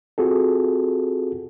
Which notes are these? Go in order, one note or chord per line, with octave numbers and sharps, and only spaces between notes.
C4 F4 F#4 G#4 A4